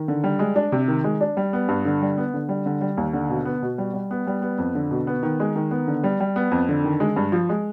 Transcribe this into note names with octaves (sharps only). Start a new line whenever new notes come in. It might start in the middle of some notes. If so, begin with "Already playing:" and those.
Already playing: D#3
D3
G3
G#3
D4
C3
D#3
G#3
D4
G3
B3
G2
D3
G3
B3
D3
G3
D3
G3
D#2
D3
B2
B3
B2
G3
G3
B3
G3
B3
F2
D3
B2
B3
D#3
G#3
D#3
B3
D3
G3
G3
B3
F2
D3
D#3
G#3
G2
F3
G#3